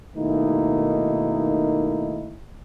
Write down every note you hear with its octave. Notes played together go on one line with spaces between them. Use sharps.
B2 D#3 A3 A#3 D#4 E4